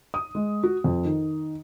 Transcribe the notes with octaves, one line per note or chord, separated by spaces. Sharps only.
D#6
G#3
F#4
F2
D#3